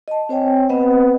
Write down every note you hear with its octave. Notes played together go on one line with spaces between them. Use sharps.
D#5 A5
C4 C5 C#5 G5 G#5
B3 C4 B4 C5 D#5 F#5